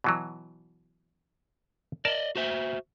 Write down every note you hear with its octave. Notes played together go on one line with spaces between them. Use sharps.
B2 E3 F#3
A#4 D5 D#5 A5
F#4 C5 E5